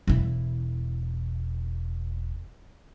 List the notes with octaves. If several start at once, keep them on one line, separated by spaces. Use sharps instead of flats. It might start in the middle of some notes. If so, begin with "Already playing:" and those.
E1 E4